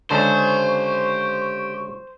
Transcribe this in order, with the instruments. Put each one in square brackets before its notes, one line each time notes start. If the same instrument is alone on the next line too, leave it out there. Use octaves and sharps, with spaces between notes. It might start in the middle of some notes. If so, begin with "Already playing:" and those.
[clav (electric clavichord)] C#2 D3 A5 [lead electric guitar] G4 G#5 [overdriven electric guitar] C5 [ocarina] C#6